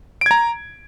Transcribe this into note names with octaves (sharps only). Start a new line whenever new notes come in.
A#5 G#6 D7